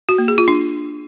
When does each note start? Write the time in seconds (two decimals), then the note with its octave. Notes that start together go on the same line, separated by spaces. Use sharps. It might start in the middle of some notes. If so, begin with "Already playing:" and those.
0.09 F#4
0.18 A#3
0.28 G#4
0.38 F4
0.48 D4